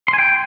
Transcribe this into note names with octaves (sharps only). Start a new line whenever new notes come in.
C6
G#5
G5